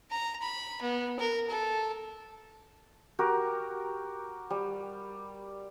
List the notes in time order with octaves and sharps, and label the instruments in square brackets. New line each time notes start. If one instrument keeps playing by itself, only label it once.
[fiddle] A#5
B5
B3
A#4
A4
[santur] F#4 G4 A#4
G3